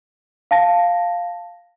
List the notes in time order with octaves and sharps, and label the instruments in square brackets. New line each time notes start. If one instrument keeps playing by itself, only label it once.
[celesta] F5 A5 A#6